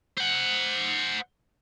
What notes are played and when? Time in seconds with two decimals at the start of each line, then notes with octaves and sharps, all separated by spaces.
0.17 C5 F#5